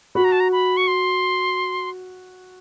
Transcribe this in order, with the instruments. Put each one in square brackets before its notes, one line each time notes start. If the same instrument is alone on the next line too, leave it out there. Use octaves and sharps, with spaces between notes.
[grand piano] F#4 [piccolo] B5
[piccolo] A#5
A5
A#5
B5
C#6
C6